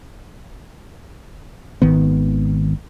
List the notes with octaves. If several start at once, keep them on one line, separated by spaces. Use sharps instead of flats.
G#1 D#3 B3